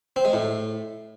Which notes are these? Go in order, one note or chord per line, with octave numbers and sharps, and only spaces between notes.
C4
G#3
A2